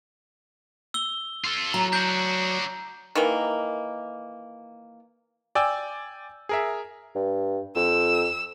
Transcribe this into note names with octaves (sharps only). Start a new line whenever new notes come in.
E6 G7
F4 A4
F#3 A#5
D4 F#4 G6
D#3 E3 A#3
D5 G5 G#5 E6
G#4 A#4 E5
G2
F2 E6